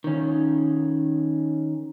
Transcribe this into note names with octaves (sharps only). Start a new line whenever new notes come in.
D#3 C#4